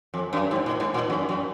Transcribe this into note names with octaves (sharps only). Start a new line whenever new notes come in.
F2
F#2
G#2
A#2
G#2
A#2
F#2
F#2